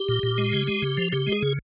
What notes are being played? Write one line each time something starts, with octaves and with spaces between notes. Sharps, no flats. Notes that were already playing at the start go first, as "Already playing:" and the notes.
Already playing: G4
A#2
A#2
G#3
C#3
G#3
C#3
F3
C#3 G4
G#3
G#4
C#3